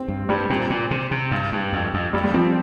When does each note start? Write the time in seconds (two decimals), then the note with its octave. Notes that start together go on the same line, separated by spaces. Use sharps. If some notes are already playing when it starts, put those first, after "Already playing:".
Already playing: C4
0.08 G2
0.29 G2 G3
0.50 A#2 C4
0.70 A#2
0.91 C3
1.11 C3
1.31 G2
1.52 G2
1.73 F2
1.94 F2
2.13 F2 G3
2.24 G3
2.34 F3 C4